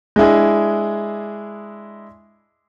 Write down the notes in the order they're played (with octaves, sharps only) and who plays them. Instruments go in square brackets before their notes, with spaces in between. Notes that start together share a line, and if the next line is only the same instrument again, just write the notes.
[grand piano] G#3 D4 E4 G#4